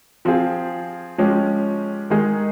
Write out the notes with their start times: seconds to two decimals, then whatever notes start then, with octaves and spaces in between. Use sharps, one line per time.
0.25 F3 C4 F4 G#4
1.18 F3 G#3 C#4 G4
2.10 D#3 G#3 D#4 G#4